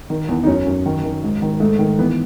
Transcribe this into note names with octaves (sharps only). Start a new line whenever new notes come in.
D#3
E2
D#4
F#2 C#4
F#2
D#3
D#3
G#2
D#3
G#2 A3
D#3
E3 B3